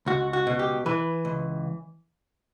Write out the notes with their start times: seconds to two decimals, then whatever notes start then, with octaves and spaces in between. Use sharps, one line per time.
0.06 C#2 F#4
0.33 F#4
0.47 B2
0.59 G4
0.86 E3 B4
1.25 C#2